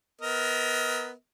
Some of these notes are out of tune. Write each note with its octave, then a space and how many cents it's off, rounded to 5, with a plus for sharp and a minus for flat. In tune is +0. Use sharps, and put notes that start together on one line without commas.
B3 +0 A#4 +0 D#5 +35